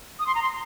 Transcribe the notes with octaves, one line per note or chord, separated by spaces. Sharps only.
D#6
C6
A#5
C6